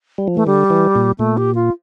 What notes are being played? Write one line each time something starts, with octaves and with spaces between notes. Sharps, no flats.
G3
F3
E3 A3
D3 G3
E3
A#2
A#2 A3
G4
F4